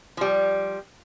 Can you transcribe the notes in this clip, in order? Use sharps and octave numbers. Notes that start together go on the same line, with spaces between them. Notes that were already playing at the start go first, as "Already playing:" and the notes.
F3 G3